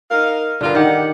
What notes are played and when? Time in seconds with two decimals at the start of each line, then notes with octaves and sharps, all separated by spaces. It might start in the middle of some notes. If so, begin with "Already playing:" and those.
0.10 D#4 A#4 F5
0.61 G2 D3 F4 A#4
0.75 D#3 G4 F#5